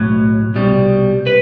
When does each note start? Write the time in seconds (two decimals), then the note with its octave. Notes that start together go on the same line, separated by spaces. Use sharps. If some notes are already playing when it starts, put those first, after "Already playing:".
Already playing: B1 A2 F#3
0.55 C2 B2 G3
1.27 B4